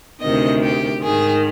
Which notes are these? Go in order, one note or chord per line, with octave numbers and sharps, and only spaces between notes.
D2 C3 D#3 D#5
G4
G#2 D#3 G#4